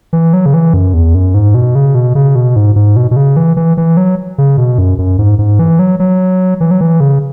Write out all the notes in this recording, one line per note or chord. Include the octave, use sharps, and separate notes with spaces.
E3
F#3
C#3
E3
F#2
E2
F#2
G#2
B2
C#3
B2
C#3
B2
G#2
G#2
B2
B2
C#3
E3
E3
E3
F#3
C#3
B2
F#2
F#2
G#2
G#2
E3
F#3
F#3
E3
F#3
E3
C#3